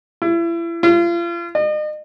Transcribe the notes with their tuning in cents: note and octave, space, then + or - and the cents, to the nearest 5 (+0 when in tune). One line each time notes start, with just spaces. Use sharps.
E4 +35
F4 -35
D#5 -40